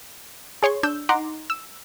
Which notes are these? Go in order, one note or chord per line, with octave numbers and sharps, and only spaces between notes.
G#4 C#5 C6 C#6
D4 E6 G6
D#4 F#5 A#5 C6 D6
E6